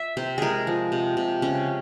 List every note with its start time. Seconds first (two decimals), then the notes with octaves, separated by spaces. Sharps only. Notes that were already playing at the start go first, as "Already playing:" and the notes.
Already playing: E5
0.17 C3 C5
0.38 G#3 G#4 A#4
0.67 F3
0.92 C3
1.17 C3
1.42 C#3 C#4